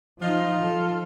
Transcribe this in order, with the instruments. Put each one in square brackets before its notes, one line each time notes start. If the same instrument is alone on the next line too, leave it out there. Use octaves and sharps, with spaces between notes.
[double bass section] F3 [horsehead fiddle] D#4 D#5 [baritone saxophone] F4
[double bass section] F3 [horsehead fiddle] A4